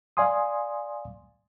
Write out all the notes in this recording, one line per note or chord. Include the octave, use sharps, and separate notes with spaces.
D5 F5 G#5 C6 D#6